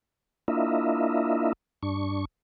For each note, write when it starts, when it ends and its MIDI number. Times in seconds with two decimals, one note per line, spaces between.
0.48 1.53 58
0.48 1.53 62
0.48 1.53 64
0.48 1.53 65
0.48 1.53 75
0.48 1.53 76
1.83 2.25 43
1.83 2.25 62
1.83 2.25 85